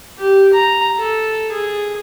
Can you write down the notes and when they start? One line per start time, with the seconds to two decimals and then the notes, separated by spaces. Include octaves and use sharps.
0.19 G4
0.54 A#5
0.98 A4
1.52 G#4